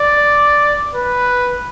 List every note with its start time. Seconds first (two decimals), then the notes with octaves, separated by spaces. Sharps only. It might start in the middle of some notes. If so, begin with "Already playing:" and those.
Already playing: D5
0.95 B4